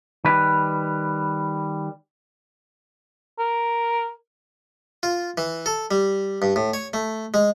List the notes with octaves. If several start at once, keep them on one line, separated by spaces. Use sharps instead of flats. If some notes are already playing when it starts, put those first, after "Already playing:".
D#3 G3 B4
A#4
F4
E3
A4
G3
G2
A2
C#5
A3
G#3